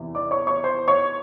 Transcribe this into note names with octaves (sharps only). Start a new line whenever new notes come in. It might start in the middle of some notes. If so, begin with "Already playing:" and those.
Already playing: E2 C3 E3
D5 D6
C#5 C#6
C#5 C#6
C5 C6
C#5 C#6